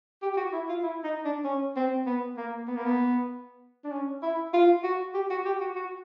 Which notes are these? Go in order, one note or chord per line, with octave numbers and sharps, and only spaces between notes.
G4
G4
F#4
E4
F4
E4
D#4
D4
C#4
C4
B3
A#3
B3
A#3
B3
D4
C#4
E4
F4
F#4
G4
F#4
G4
F#4
F#4